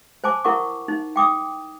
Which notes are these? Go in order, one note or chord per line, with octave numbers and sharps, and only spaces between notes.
C5 G#5 A5 D6
E4 A#4 F#5 C#6 D6
D#4
G5 D6 D#6